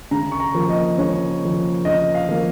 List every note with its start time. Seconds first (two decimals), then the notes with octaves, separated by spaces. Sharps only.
0.11 C#3 A#5
0.32 C#6
0.40 A#5
0.55 F3 A#3
0.69 D#5
0.98 C#3 C#5
1.42 F3 A#3
1.85 C#3 D#5
2.14 F5
2.29 F3 A#3